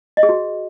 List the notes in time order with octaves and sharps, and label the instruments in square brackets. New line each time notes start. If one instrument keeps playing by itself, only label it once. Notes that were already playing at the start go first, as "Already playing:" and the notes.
[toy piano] D#5
G#4
F#4